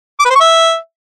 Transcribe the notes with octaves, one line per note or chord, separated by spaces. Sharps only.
D6
B4
C5
C#6
E5